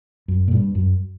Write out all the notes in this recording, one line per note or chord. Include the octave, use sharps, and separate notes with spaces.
F#2
A#2
G2
F#2